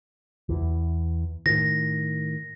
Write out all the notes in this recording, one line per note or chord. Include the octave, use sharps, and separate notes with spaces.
E2 E3
A2 D#3 A#6